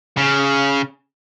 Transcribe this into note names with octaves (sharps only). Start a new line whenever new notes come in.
C#3